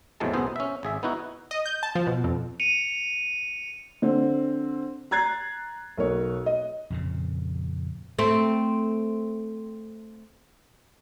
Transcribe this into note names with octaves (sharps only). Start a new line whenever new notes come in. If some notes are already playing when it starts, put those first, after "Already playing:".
E2 A2 C3 F#3 G#3 A5
B1 F#2 B3 G#4 C5
C#4 E5
G#1 G#4 E5
B3 D#4 E4 F#4
D#5
G6
A5
F3
B2
F2
C#7 D#7 F7
D3 C4
A#5 F#6 G#6 A6 C7
B1 A#4 C#5
D#5
F2 A#2 C#3
A3 C4